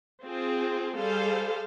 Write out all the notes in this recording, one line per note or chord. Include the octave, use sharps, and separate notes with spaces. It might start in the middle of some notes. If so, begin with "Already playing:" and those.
C4 F4 G#4
G3 G#4 A4 C5 F5